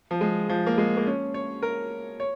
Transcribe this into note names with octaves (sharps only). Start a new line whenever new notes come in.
F3
G#3
F3
A#3
G#3
A#3
C#4
C#5
A#4
C#5